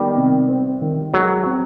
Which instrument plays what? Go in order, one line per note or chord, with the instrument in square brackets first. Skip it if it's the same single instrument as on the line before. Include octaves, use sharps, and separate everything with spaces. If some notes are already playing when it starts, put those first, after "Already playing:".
Already playing: [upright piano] D#3 B3 [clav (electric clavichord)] G3
[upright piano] C3
C4
D#3
[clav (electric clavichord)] F#3 [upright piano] G#3
[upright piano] C4